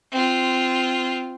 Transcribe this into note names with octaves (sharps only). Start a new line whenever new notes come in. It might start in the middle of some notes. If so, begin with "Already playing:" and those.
C4 F4